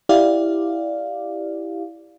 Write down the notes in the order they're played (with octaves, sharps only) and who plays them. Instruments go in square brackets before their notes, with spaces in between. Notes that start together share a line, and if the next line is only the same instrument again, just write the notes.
[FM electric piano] E4 G4 D5 F5